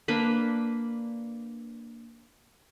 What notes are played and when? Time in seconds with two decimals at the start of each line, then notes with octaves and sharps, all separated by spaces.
0.08 A#3 D4 B4 B5